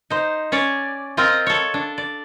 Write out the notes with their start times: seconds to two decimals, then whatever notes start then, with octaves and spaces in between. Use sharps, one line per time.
0.10 D#4 C5
0.52 C#4 C#5 D5
1.17 C4 F4 A#4 D#5 F5
1.46 A4 C#5
1.74 D4
1.98 D5